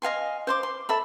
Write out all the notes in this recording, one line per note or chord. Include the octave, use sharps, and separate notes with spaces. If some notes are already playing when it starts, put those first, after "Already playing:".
D#5 F5 G#5 C6
C5 C6 D6
C6
A4 E5 B5